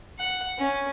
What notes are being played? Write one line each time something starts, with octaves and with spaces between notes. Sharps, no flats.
F#5
C#4